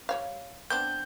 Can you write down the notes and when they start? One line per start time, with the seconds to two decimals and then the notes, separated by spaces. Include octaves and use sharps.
0.09 G3 C#5 F5
0.70 B3 C4 D4 G6